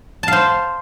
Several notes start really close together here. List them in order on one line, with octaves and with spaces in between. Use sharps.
A5 F5 C5